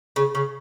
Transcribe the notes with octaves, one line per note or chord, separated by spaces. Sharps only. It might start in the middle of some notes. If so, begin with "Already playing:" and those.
C#3
C#3